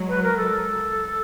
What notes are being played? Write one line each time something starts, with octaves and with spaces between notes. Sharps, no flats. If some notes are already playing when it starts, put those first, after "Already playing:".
Already playing: F#3 G#3
B4
A#4
A4